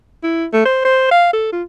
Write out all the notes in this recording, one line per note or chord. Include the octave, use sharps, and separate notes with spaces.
E4
A3
C5
C5
F5
A4
F4